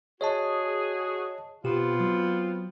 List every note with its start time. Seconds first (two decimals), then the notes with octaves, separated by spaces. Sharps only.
0.21 F#4 G#4 C#5 D#5 A5
1.64 B2 B3 C4 F4 G4
2.00 F#3